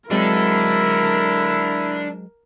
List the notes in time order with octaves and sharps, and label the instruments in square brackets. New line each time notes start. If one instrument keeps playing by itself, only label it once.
[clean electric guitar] F#3 G#3 C4 [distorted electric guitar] D4 A4 [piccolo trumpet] E4 [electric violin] A#4